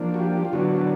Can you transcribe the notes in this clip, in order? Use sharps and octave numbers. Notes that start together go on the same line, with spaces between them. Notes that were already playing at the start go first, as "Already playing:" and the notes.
Already playing: F3 A#3 D4
F#4
G4
F4
D3 F#3 B3 D4 F#4
F#4